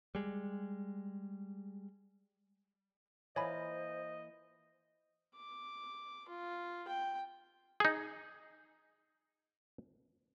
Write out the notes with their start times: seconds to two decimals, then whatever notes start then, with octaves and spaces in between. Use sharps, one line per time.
0.15 G3 G#3
3.36 E3 A#3 F4 C5 C#5 D#5 G#5 B5
5.35 D6
6.28 F4
6.87 G5
7.80 D#4 G#4